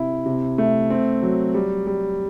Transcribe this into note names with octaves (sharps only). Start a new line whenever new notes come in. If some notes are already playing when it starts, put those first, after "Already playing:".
Already playing: C3 E4
C3
A3
C4
F#3
G3
G3